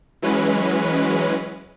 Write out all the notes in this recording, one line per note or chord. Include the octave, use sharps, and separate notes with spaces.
E3 F#3 G#3 C#4 B4